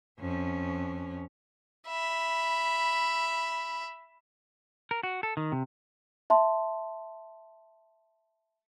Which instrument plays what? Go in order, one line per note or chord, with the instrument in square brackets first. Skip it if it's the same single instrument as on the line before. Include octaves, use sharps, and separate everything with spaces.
[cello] F2 C#4
[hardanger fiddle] E5 B5
[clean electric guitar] A#4
F#4
A4
D#3
C3
[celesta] E5 A5 C6